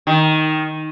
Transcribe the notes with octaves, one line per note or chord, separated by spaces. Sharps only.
D#3